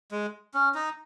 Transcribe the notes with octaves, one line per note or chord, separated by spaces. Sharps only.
G#3
C#4
D#4